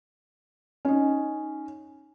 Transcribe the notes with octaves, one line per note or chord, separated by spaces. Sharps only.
C#4 D#4